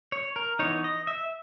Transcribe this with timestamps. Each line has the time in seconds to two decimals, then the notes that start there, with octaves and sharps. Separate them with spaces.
0.12 C#5
0.36 A#4
0.59 E3 B3 D#4 C#5
0.84 D#5
1.07 E5